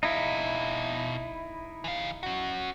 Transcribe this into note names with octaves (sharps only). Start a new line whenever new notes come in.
B2 D#4 E4 F5
E3 F5
C#4 F#4